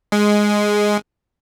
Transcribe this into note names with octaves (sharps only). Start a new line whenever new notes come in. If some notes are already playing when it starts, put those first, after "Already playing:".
G#3